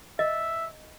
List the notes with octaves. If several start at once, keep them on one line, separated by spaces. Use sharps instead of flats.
D#5 E5